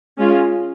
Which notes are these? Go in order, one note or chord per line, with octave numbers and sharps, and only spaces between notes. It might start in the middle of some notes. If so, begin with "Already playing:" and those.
G#3 C#4 F4